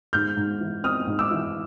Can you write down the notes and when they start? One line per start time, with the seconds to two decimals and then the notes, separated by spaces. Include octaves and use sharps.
0.13 G#2 F6 G6
0.37 G#2
0.60 E3
0.84 C4 D#6 F6
1.07 G#2
1.19 D6 E6
1.31 E3